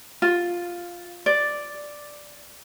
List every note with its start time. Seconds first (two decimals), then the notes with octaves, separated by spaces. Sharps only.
0.22 F4
1.26 D5